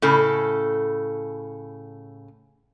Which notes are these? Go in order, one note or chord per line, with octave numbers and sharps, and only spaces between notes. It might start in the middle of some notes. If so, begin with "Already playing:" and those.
A2 C#3 A4